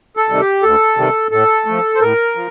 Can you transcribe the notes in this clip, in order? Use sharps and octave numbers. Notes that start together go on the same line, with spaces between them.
A4
C3 D#3 G3
G4
D2 A4
C3 D#3 G3
A2 A4
F3 A3
C5
A2 A#4
F3